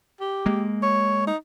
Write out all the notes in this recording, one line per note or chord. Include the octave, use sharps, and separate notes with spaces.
G4
G#3 A#3
C#5
D#4